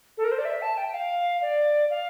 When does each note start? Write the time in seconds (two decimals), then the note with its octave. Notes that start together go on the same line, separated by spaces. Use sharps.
0.18 A4
0.24 A#4
0.31 C5
0.38 D5
0.45 E5
0.62 A5
0.77 G5
0.94 F5
1.42 D5
1.90 F5